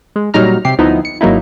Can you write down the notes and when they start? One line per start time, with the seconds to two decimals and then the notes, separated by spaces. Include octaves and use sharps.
0.16 G#3
0.34 A#2 F#3 G3 D#4 A#5 F6
0.65 C3 G4 C7
0.78 D2 F3 B3 D#4 E4
1.05 C#7
1.21 G#1 F#3 A#3 D#4 E4